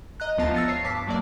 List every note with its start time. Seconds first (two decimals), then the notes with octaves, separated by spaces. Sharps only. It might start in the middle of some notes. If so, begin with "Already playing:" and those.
0.20 D#5 A#5 F#6
0.38 D2 F3 B3 F4 A5 A#6
0.54 E6 F6 A6 A#6 C#7 D#7
0.68 C#5 C7
0.84 G2 A5 D6 B6
1.07 F#3 A#3 D5